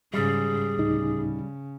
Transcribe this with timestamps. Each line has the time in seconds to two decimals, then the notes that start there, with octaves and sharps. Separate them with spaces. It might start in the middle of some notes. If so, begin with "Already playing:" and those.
0.14 G#2 C#3 G3 G#4
0.77 D2 A2 C#3 D#4